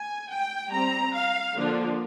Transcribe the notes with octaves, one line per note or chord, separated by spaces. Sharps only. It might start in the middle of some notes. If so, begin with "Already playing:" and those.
Already playing: G#5
G5
G3 C4 A#5
F5
D3 F3 A#3 D4